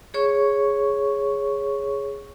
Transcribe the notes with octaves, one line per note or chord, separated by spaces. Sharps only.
G#4 C#5 C#6